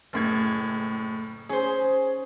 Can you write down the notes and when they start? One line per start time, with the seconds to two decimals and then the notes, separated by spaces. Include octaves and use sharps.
0.13 F#1 A2 G#6
1.49 C#4 G#4 C5